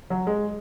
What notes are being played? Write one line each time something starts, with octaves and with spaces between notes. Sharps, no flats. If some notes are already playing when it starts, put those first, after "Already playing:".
F#3
G#3